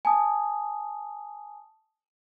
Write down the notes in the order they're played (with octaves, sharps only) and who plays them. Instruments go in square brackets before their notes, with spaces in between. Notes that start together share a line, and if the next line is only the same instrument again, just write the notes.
[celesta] G#5 A5 D#6